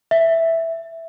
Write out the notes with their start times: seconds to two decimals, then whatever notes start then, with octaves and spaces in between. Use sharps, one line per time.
0.11 E5